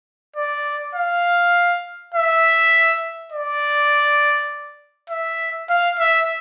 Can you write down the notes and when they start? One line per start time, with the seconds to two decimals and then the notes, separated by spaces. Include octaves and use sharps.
0.36 D5
0.95 F5
2.14 E5
3.32 D5
5.10 E5
5.70 F5
5.99 E5